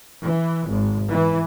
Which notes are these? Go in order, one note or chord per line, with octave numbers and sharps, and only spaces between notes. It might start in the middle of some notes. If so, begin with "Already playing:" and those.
E3
G#1
E3